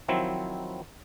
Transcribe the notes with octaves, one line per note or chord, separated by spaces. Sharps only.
D#3 F3 F#3 C4 E4